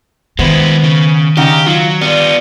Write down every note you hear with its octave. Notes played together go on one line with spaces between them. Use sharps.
D#3 G#3 B3 E4 C5
C#3
C#3 D#4 G4 F#5
F#3 F4
G3 B3 F4